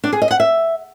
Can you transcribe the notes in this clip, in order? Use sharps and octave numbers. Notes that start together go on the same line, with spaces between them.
D4
G#4
D#5
F#5
E5